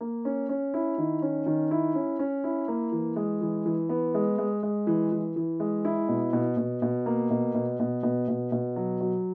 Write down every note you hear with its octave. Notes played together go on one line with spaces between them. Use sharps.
A#3
C#4
C#4
E4
D#3
C#4
D#3
E4
C#4
C#4
E4
A#3
E3
G#3
E3
E3
B3
G#3
G#3
G#3
E3
E3
E3
G#3
E4
B2
B2
B2
B2
A#3
B2
B2
B2
B2
B2
B2
F#3
F#3